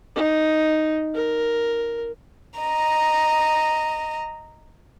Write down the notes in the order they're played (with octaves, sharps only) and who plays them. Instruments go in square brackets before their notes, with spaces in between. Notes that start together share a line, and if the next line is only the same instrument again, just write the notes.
[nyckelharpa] D#4
A#4
[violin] D#5 A#5